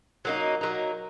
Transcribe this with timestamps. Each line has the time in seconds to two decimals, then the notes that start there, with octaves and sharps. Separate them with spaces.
0.25 F#3 A#3 D#4
0.61 F#3 A#3 D#4